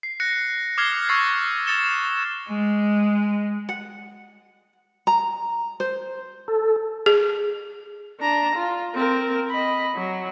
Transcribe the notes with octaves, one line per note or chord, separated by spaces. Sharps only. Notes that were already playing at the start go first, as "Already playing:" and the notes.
C7
F#6 A#6 C#7
D6 D#6 F6 G#6 C7 G7
C#6 E6 F#6 A6 C7
D#6 A6 C#7 E7 G7
G#3
F#5
A#5
C5
A4
G#4
D4 A#5
F4
C4 A#4
D#5 B5
F#3